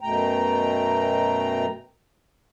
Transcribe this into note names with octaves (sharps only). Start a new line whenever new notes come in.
F#2 B2 A3 G5 A#5